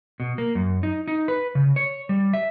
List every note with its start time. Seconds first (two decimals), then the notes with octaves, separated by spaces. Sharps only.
0.20 B2
0.38 A#3
0.55 F#2
0.83 D#4
1.08 D#4
1.28 B4
1.55 C#3
1.76 C#5
2.09 G3
2.33 E5